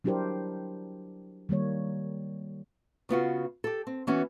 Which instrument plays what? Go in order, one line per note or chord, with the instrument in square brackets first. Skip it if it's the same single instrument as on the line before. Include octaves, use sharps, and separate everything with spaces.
[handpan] F#3 D4 E4 G4 A#4 C5
D#3 G3 A#3 C#5
[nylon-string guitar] C#3 B3 F4 F#4
G4 A4
C4
E3 B3 C#4 F#4